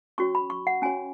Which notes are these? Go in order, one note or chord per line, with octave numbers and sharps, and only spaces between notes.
C#4 F#4 C#5 C#6
B5
C#6
F#5
C#4 F#4 C#5 G#5